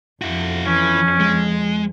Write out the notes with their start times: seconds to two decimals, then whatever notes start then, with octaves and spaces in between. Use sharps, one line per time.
0.22 F2 E4 F#4
0.67 E3 C#4
1.20 G#3